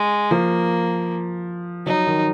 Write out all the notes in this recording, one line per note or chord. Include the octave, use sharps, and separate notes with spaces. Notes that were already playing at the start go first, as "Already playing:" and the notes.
Already playing: G#3
F3 A#3
F#3 D#4
D#3